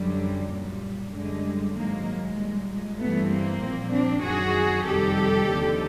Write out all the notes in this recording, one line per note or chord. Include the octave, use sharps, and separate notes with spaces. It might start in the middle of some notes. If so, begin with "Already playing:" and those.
Already playing: F#2 D3 F#3 G3
A#2 G3
F#2 D3 G3 G#3
G#2 D#3 F#3 G#3 A#3
G#3
A#2 G3
G#3
G2 E3 G3 A3 B3
A#3 C4
A#2 F3
C4 D4
F#2 D#3 F#3 F#4 G#4
F2 C3 D#3 G3 G4 A4
D#2 D3 F3